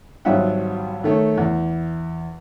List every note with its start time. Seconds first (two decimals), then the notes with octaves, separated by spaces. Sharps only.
0.25 G#1 F#3 G3 F4 E5 F#5
1.04 D#3 A3 C#5
1.38 E2